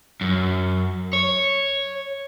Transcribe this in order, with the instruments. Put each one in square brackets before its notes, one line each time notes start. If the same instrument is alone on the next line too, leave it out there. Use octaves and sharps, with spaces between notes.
[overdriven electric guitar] F#2
C#5